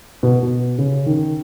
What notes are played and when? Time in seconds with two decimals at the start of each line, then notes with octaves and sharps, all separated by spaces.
0.23 B2
0.42 B2
0.78 C#3
1.06 D#3